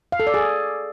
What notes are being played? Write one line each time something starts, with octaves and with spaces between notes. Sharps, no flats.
F5
A4
D5
G#4